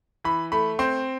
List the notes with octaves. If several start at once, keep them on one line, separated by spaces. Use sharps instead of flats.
E3 B5
A3 B5
C4 C6